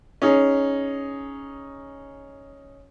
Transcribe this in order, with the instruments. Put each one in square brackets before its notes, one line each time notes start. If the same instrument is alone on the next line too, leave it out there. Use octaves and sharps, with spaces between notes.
[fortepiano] C#4 D#4 G#4